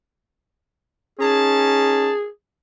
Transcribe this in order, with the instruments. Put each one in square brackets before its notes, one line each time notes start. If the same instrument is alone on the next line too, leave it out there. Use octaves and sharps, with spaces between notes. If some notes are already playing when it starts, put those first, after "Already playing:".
[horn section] C#4 D#4 A5 [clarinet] G#4